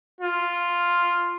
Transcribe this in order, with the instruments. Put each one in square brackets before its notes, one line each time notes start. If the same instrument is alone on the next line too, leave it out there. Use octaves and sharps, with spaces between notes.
[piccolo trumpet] F4